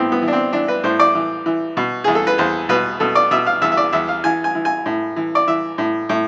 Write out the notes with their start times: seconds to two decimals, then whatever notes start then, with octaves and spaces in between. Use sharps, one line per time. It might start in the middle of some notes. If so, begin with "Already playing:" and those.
Already playing: A2 B3 C4
0.12 B3
0.22 E3
0.28 D4
0.33 C4
0.52 E3 D4
0.68 B4
0.84 A2 C5
0.99 D5
1.15 E3
1.46 E3
1.77 B2
2.04 E2 G#4
2.15 A4
2.27 B4
2.38 E2 C5
2.69 B2 B4
3.00 B2 A4
3.15 D5
3.31 B2 E5
3.47 F5
3.62 E2 E5
3.72 E5
3.77 D5
3.92 E2 E5
4.09 F5
4.24 E3 G#5
4.44 G#5
4.55 E3
4.65 G#5
4.86 A2
5.16 E3
5.35 D5
5.47 E3 E5
5.78 A2
6.09 A2